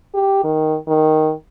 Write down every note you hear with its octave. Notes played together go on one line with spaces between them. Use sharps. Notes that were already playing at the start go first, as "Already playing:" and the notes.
G4
D#3
D#3